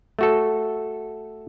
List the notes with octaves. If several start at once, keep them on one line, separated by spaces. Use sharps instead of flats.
A3 F#4 A4